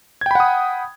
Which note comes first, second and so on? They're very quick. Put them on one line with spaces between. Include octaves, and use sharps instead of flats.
G#6 G5 B5 F#5 D#6